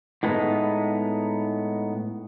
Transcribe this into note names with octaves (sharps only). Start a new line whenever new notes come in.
A2 G#3 B3 D#4